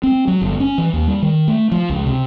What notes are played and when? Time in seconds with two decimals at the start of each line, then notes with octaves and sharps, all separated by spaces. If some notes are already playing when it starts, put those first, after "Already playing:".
0.03 C4
0.28 F#3
0.42 G1
0.60 C#4
0.78 E3
0.93 D#2
1.07 G3
1.22 D#3
1.48 A3
1.72 F3
1.90 C#2
2.06 C3